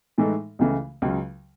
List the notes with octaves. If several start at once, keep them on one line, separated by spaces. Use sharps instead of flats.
A2 E3 G#3 D#4 A4
C#2 C#3 E3 A3
C#2 C#3 F#3